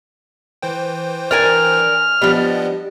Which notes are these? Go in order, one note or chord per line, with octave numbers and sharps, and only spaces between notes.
E3 C5 G5
D4 A#4 G#5 F6
F3 G3 B3 D4 D#5